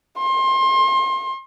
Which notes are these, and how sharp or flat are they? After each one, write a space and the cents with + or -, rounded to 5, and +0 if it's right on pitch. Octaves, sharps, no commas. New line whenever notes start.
C6 +30